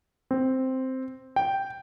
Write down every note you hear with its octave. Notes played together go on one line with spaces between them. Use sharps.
C4
G5